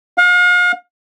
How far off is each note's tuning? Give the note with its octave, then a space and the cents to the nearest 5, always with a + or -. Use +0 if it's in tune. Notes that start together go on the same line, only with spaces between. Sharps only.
F5 +40